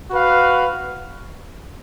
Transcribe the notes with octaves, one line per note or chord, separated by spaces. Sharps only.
F#4 B4 F5